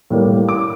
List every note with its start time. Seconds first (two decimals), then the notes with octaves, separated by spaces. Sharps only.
0.10 A2 G3 A#3
0.49 D6